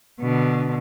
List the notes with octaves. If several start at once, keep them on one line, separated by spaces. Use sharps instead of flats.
B2 D3